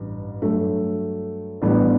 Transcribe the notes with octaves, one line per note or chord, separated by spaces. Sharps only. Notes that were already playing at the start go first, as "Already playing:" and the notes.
Already playing: A1 G2
G2 F#3 A3
A1 A2 G3 B3 D4